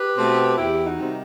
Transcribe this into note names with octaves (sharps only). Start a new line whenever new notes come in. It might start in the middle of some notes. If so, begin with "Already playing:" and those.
Already playing: G4 B4
B2 A3 C4
E2 E4 G4
D#4 F#4
C3 D#3 G3 C4